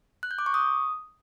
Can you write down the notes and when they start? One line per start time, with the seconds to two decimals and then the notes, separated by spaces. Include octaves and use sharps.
0.23 F#6
0.31 G6
0.39 D6
0.46 C#6
0.54 D#6